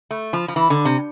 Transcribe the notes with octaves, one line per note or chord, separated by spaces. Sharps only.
A3
F3
F3
E3
D3
C3